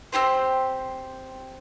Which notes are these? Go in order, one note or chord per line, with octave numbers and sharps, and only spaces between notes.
C4 E4 G4 C5